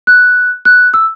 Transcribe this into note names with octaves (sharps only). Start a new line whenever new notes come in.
F#6
F#6
E6